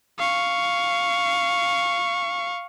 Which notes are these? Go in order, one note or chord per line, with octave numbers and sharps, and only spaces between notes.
F5 C#6